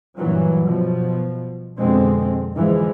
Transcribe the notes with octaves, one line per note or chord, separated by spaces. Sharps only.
G2 A#2 E3 F#3
B2 F3
F2 B2 D3 G#3 C4
G#2 D3 E3 F3 G#3